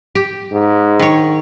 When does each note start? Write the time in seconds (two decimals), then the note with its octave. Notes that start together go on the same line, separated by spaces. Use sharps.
0.15 G4
0.52 G#2
1.00 D#3 C#5